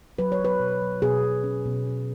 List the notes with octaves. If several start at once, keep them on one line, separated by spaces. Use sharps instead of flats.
F#3 B4
C#5
F#3 B4
B2
F#3
B2 G#4
B2
C#4
B2
C#4